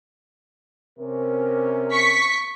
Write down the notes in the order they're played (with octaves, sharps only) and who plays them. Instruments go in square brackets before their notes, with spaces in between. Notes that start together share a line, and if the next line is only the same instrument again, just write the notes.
[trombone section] C3 C#4 A#4
[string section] C#6 B6